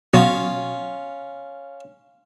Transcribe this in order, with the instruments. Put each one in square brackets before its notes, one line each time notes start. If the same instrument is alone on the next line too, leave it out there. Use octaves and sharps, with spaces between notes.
[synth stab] B2 F#3 [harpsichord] C#4 F4